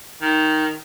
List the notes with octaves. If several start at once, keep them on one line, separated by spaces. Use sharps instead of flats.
D#3